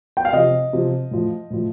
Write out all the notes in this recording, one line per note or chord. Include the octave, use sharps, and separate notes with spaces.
G5
F5
C3 F3 D#5
C3 F3
A2 F3
A2 F3